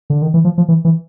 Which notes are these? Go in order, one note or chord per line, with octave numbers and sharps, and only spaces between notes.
D3
D#3
E3
F3
F3
E3
E3